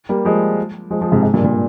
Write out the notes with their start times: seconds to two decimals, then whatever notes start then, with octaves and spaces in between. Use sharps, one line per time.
0.09 G3 A#3
0.25 F3 G#3
0.91 F3 G#3
1.01 F3 G#3
1.12 G#2 C3
1.23 G#2
1.34 G2 A#2
1.44 A#2